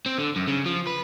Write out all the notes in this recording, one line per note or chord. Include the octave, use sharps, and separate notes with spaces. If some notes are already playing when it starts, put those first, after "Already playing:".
C4
D3
F#2
C#3
F3
B4